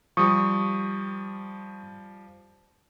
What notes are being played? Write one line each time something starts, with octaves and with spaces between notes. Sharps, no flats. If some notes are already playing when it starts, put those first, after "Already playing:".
F3 G3 C#6 D#6